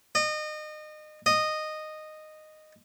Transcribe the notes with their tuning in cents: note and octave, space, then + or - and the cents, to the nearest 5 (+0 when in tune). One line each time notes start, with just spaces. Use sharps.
D#5 -30
D#5 -10